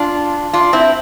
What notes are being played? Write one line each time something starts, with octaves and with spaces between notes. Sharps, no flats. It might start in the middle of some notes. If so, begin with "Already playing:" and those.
Already playing: D4 F4
D4 F4
C4 E4